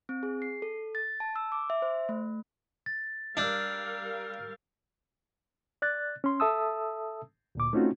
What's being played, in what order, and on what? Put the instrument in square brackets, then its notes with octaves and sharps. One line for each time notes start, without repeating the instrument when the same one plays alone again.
[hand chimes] C4
G#4
C7
A4
A6
A5
E6
D6
E5
C5
A3
[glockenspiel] A6
[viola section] G3 A#4 F5 [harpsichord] D4 [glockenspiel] E6 G6 A6
[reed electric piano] D5 F#6 A6
C#4 C6
A4 E5 A5 D#6 E6
D2 A#2 D6
A3 C4 C#4 D#4 F4 F#4